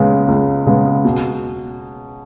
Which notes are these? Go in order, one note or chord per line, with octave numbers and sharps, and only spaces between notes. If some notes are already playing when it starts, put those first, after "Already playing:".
Already playing: C#2 C#3 G#3 B3
C#2
C#3 G#3 B3
B2